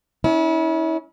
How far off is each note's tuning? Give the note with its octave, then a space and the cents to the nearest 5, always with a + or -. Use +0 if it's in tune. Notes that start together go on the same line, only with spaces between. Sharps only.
C#4 +25 E4 -35